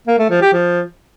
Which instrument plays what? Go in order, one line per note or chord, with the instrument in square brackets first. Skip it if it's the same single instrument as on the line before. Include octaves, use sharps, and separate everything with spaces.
[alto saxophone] A#3
A3
F3
G4
F3